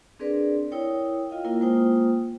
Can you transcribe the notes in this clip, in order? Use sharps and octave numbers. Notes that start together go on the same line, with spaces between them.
C4 D4 G#4 A#4 B4 D5
E4 A#4 C#5 G5 D#6
F4 D#5 F5 G5
A#3 E4 F4 A#4
G#3 A#3 F4 C5 G5 D#6